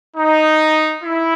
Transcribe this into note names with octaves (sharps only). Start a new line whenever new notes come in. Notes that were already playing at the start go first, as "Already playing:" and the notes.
D#4
E4